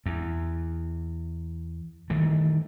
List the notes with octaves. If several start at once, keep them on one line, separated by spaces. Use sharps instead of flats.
E2
D#3 E3 G3 A3